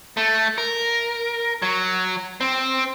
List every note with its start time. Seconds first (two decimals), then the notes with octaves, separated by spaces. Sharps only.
0.17 A3
0.58 A#4
1.62 F#3
2.41 C4